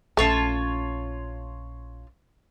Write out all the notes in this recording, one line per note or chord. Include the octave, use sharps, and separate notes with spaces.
A#1 A3 C#4 F4 C#5 A5